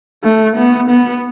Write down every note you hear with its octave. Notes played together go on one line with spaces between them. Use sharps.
A3
B3
B3